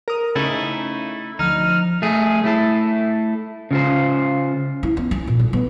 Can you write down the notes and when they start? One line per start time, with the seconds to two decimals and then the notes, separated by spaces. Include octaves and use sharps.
0.08 A#4 D#6
0.35 C#3 A3 D#4 E4
1.39 D2 F3 D#4 F6
2.02 A3 G#4
2.44 A3 E4 A4
3.71 C#3 F4 C5
4.83 E4
4.97 B3
5.11 C#4
5.27 A#2
5.39 D3
5.53 B3